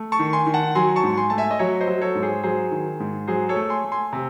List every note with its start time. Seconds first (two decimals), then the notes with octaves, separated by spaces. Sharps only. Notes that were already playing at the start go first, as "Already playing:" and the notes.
Already playing: A3
0.12 A5 C#6
0.19 D#3
0.33 G#5 C6
0.47 D#3
0.54 F#5 A5
0.75 F#3 G#5 C6
0.96 A5 C#6
1.04 G#2
1.17 G#5 C6
1.30 A3 A5
1.38 E5 G#5
1.51 D#5
1.59 F#3 C#5 E5
1.80 C5 D#5
1.87 F#3
2.02 A4 C#5
2.15 G#2
2.23 G#4 C5
2.43 F#3 G#4 C5
2.72 D#3
3.00 G#2
3.28 F#3 G#4 C5
3.49 A4 C#5
3.56 A3
3.70 G#5 C6
3.84 A3
3.92 G#5 C6
4.13 C3